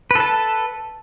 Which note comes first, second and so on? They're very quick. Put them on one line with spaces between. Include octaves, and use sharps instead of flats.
B4 A4 A5